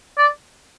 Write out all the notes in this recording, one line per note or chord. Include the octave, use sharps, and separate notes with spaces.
D5